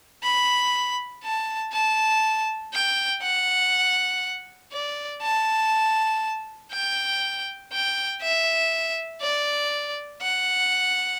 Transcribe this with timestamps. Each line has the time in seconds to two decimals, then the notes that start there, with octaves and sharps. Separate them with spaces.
0.24 B5
1.24 A5
1.73 A5
2.74 G5
3.23 F#5
4.73 D5
5.22 A5
6.72 G5
7.72 G5
8.22 E5
9.22 D5
10.22 F#5